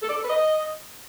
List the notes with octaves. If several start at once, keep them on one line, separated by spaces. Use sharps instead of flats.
A4
D5
A4
B4
D#5